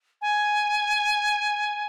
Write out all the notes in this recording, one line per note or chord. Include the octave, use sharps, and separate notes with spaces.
G#5